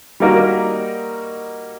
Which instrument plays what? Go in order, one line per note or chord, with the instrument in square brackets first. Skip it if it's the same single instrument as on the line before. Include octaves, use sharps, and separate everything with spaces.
[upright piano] G3 A#3 D#4 F#4 A#4